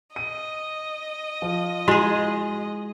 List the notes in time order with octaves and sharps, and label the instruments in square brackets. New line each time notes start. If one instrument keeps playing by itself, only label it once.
[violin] D#5 [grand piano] D#7
[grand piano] F3
[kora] G#3 G#4 [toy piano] E4 F#4